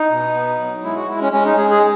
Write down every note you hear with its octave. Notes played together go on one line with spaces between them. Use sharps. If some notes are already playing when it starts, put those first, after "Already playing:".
Already playing: D#4
B2
B3
F#3
G#3 E4
F#4
G#3 E4
C#4
G#3 C#4
D#4
G#3 G#4
G#4